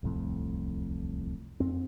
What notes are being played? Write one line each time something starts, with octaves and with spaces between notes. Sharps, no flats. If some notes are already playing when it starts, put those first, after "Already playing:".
D1 C2 F2 A2
F2 C4